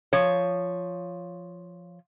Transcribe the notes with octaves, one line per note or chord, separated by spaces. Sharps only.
F3 C#5